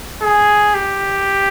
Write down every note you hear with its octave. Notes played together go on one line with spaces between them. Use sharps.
G#4
G4